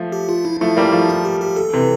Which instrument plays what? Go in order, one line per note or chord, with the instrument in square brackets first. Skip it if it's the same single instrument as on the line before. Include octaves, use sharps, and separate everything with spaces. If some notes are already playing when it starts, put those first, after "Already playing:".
Already playing: [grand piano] F3 A3
[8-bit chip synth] G4
F4
E4
[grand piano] F3 A3 [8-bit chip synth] E4
[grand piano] G3 A#3
F3 A3
[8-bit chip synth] F4
G4
G4
A4
[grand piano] C3 E3